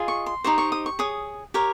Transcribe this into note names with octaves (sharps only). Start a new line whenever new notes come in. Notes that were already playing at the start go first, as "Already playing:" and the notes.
Already playing: F4 G#4 D#5
C#6
C6
D#4 G4 C5 C#6
C#6
D#6
C#6
G#4 C#5 D#6
G4 A#4 C#5